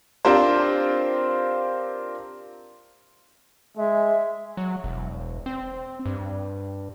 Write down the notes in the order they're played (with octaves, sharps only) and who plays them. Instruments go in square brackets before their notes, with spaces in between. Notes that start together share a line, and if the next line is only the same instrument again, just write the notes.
[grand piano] C4 D4 F4 G4 A#4 C5
[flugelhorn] G#3 [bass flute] E5
[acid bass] F#3
E1
C4
G2